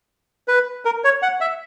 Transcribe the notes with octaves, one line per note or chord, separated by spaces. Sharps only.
B4
A#4
C#5
F#5
E5